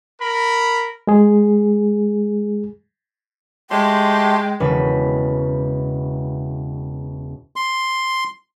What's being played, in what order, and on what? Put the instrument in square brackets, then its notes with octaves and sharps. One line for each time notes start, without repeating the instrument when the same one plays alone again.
[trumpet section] A#4 B5
[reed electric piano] G#3 G#4
[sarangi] G#3 [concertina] A3 G4 C6 [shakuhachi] G5
[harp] E1 C#3 E3 B4 B5
[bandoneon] C6